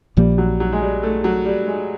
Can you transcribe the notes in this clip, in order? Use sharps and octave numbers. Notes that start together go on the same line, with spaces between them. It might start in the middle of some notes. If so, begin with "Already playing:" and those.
A#1 A#2 F3 G3 A#3
F#3
F#3
G#3
G3
A3
F#3
G3
G#3